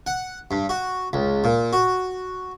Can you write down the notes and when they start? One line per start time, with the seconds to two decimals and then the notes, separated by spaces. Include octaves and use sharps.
0.07 F#5
0.51 G2
0.69 F#4
1.13 C#2
1.44 A#2
1.73 F#4